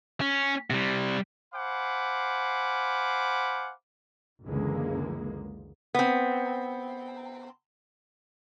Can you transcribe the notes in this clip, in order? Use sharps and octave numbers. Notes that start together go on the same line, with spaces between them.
C#4
C3 G3
C5 F5 F#5 G#5 B5 D6
F#1 C#2 D3 E3 G#3 A#3
B3 C4